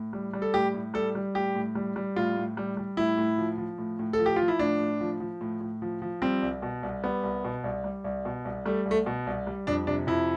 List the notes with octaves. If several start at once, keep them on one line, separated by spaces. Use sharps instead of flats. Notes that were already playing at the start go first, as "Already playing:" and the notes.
Already playing: A2
G3
G3
A4
A2 G4
A2
G3 A4
G3
A2 G4
A2
G3
G3
A2 F4
A2
G3
G3
A2 E4
A2
F3
F3
A2
A2
A4
F3
G4
F3 F4
E4
A2 D4
A2
F3
F3
A2
A2
F3
F3
G3 C4
C2
B2
C2
G3 B3
C2
B2
C2
G3
C2
B2
C2
G3 A3
C2
A3
B2
C2
G3
F2 D4
C3 D4
F2 E4